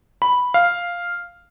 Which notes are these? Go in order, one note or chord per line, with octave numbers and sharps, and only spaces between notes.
B5
F5